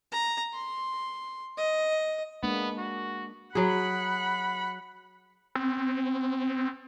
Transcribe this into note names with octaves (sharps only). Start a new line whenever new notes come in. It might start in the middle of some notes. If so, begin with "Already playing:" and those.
A#5
C6
D#5
G#3 A#3 B3 D4
F#4
F#3 G#4 F#5 B5
C4